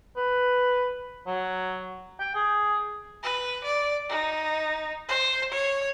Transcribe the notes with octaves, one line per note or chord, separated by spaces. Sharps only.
B4
F#3
G5
G#4
B4
D5
D#4
C5
C#5